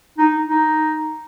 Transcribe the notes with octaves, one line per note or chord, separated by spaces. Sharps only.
D#4
D#4